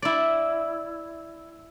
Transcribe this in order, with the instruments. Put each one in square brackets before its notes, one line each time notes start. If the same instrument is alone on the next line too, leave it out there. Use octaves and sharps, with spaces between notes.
[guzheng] E4 D5